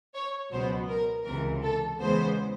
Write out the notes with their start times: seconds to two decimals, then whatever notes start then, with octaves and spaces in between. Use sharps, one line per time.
0.14 C#5
0.51 C#2 B2 F#3 B3 C5
0.89 A#4
1.25 C#2 C3 E3 A#4
1.63 A4
2.00 E2 C#3 E3 G#3 B3 C5